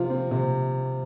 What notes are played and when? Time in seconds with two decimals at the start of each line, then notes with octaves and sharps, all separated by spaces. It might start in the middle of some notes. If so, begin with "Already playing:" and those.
Already playing: C3 F3 F4
0.10 C4
0.31 C3